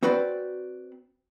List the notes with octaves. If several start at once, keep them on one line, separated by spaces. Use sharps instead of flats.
C4 F#4 B4 C5 D5